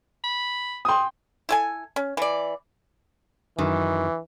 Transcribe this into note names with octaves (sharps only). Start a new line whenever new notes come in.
B5
G5 G#5 C6 D#6
E4 A4 G#5
C#4
E3 D5
F#2 D#3 E3